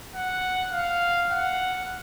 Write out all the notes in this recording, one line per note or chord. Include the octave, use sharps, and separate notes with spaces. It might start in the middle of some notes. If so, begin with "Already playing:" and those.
F#5
F5
F#5